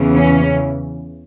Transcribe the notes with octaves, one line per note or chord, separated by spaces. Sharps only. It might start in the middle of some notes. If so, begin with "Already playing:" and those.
Already playing: E2 C#3 E3
C#4